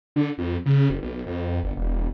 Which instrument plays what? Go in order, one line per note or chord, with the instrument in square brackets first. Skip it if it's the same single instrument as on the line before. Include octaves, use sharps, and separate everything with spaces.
[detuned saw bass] D3
F2
C#3
F#1
B1
F2
G1
E1